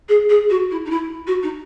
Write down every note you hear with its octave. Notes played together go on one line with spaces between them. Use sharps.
G#4
G#4
F#4
E4
D#4
E4
F#4
D#4